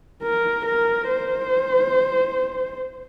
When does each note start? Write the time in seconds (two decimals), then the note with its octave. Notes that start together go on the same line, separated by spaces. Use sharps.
0.22 A#4
0.65 A#4
1.08 C5